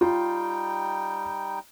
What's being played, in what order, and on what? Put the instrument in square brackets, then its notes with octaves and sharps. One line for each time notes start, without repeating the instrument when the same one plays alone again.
[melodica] G3 D#4 G5 [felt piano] F4